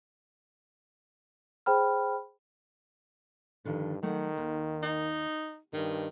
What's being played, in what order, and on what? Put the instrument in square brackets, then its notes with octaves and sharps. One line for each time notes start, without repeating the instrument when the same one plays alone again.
[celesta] G#4 C5 G5 B5 F6
[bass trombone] G2 [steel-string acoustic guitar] D3 D#3 F3
[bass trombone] D#3 [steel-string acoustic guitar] F#3 A3 F#5
[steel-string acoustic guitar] D#2
[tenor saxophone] D#4
[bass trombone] G2 [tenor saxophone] D#3 [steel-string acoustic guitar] D#5